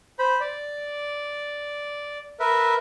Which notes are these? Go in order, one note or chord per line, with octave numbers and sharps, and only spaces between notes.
C5 B5
D5
A#4 B4 E5